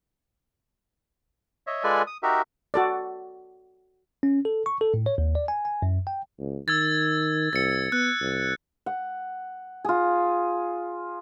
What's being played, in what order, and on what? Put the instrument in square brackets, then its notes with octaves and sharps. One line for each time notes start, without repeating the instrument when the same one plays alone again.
[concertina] C#5 D#5 E5
G#3 F4 A4 B4 D5 G#5
D#6
D#4 F#4 G4 A#4 E5
[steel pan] F#4 A4 D5
[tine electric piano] C#4
A4
C#6
A4
A2
C#5
D#2
D5
G#5
G#5
F#2
G5
[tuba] C#2
[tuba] D#3 [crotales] E6 G#6 A6
[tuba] C2 [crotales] A6 C#7
[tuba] B3 [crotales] F#6
[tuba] C2
[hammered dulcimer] F#5
F4 G#4